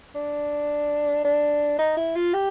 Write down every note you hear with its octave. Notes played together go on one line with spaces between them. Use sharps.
D4
D4
D#4
E4
F4
G4